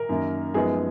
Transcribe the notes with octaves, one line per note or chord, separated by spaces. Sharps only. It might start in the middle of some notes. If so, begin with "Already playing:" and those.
Already playing: A#4 A#5
F#2 D#3 A#3
F#2 F3 G#3 B3 D#4 G#4 G#5